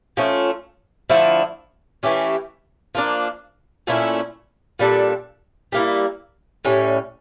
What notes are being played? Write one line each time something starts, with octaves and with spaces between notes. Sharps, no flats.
F3 A3 C#4
D3 F3 A3 E4
E3 A3 C#4 G4
F3 A#3 D4
A#2 A3 C#4 E4
A#2 G3 D4 A4
G3 A#3 E4
A2 G3 C#4